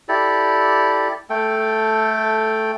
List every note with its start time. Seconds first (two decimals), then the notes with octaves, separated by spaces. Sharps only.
0.09 E4 G4 A4 D5
1.30 A3 A4 G5